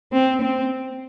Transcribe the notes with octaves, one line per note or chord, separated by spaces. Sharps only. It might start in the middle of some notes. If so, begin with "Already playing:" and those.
C4
C4